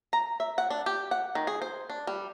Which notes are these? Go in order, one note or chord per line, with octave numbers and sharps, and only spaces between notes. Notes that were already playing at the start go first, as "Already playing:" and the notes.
A#5
E5
F#5
D4
G4
F#5
D#3
G#4
C5
D4
G3